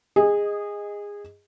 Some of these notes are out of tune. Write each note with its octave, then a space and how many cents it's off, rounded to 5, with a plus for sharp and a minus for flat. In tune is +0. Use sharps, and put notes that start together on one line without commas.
G#4 -20 D#5 +0